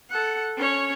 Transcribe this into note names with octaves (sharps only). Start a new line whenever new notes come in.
A4 F#5
C#4 C#5